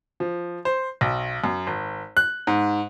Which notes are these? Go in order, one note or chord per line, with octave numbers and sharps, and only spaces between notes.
F3
C5
B1
F#2
G#1
F#6
G#2